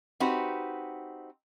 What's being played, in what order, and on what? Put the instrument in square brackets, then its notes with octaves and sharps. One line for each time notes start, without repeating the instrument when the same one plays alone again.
[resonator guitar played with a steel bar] C4 D#4 F#4 G4 B4